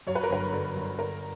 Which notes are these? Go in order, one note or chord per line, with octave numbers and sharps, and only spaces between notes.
F#2 C#5
B4
A#4
G1 B4
D3
G1
D3 A#4